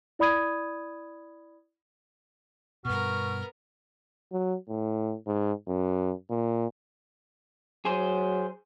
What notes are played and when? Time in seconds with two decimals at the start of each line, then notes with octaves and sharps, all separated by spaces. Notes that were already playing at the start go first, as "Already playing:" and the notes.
0.19 E4 D5 B5 D#6 G#6 D#7
2.85 G2 B2 B3 F#4 A#4 F6
4.32 F#3
4.68 A2
5.27 G#2
5.67 F#2
6.30 A#2
7.85 F#3 G#4 C5